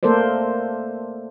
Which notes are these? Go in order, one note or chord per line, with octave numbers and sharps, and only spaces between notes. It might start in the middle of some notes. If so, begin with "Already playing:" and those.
A3 A#3 A4 A#4 C5 D5